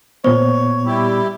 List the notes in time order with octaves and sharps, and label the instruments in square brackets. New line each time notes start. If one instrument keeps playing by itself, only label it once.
[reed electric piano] A#2 B3 [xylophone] C5 [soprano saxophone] C#5
[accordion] G3 E4 G4